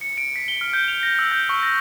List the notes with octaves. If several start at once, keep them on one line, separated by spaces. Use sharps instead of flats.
C#7
D7
B6
G7
F6
G6
F7
A#6
E6
G6
C#6
A#6